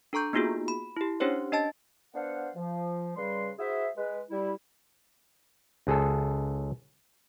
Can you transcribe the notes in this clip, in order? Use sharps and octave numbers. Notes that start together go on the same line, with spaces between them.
D4 A4 A#5 C#6 G6
A#3 B3 D#4 F4 F#4 G#4
B5
E4 G4
C#4 D4 G4 C5 C#5
D4 D#5 A5 A6
B3 D4 C5 F5 F#5
F3
C#3 G3 B4 C6
E4 F#4 G#4 C5 E5
G#3 B4
G3 E4
C#2 G#4 A4